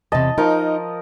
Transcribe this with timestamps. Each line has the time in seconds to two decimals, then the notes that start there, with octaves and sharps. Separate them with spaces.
0.12 E2 C3 D#5 A5
0.38 F3 D#4 A#4